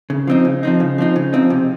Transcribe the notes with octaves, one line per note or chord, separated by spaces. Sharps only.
C#3
F3 C4 D#4
C#3
F3 C4 D#4
C#3
F3 C4 D#4
C#3
F3 C4 D#4
C3